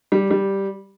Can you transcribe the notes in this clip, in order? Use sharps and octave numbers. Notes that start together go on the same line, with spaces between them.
G3
G3